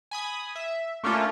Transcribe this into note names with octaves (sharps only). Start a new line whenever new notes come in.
G#5 B5 D#6
E5
A3 A#3 C#4 D4 F4 A4